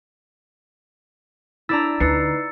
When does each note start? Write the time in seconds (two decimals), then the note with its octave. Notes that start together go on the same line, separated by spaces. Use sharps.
1.69 D4 E4 D5 A#5 E6 A6
2.00 D2 D#4 B4 E6 A6 C7 C#7